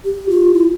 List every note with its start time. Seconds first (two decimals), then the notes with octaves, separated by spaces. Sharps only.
0.05 G4
0.29 F4
0.54 E4